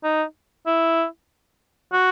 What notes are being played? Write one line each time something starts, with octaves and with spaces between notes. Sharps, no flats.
D#4
E4
F#4